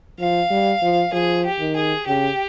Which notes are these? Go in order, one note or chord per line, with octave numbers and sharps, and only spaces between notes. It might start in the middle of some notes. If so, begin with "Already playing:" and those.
F3 F5
G3
F3
F3 G#4
G4
D#3
G#4
C#3 G4